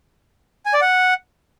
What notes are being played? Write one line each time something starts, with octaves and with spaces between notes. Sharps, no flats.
G#5
D5
F#5